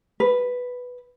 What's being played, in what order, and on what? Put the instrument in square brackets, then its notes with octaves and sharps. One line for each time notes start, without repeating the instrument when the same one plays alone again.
[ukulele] B4